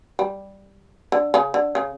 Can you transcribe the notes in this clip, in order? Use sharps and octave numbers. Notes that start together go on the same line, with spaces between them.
G3
D3
C#3
D3
C#3